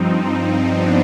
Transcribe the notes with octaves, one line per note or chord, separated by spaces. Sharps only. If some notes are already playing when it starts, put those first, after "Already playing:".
Already playing: G2 F3 C4 D#4
B3 D4